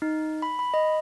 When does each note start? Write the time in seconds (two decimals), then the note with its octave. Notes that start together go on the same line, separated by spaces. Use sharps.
0.02 D#4
0.42 B5
0.59 B5
0.74 D#5